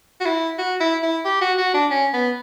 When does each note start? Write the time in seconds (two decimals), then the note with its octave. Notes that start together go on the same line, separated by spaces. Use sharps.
0.20 F#4
0.26 E4
0.58 F#4
0.80 E4
1.03 E4
1.25 G4
1.41 F#4
1.58 F#4
1.74 D4
1.91 C#4
2.13 B3